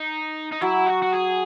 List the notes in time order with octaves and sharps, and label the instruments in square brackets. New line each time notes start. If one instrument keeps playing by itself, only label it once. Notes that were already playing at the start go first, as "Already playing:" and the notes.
Already playing: [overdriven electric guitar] D#4
D#4
[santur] F#3 [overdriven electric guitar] E4
[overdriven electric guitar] F#4
F#4
G#4